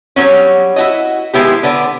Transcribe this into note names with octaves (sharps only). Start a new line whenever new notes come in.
F#3 G3 B3 C#4
E4 F#4 D#5
D#3 G#3 B3 E4 G4
D3 B3 D5